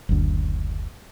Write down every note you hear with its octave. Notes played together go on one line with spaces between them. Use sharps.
F#1 D2